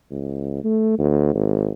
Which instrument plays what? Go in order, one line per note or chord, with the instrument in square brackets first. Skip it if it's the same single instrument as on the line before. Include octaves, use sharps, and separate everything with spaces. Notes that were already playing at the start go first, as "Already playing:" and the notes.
[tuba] C#2
A3
D2
G#1